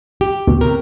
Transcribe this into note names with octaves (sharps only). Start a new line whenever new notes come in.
G4
D2 B2
A2 C3 A#4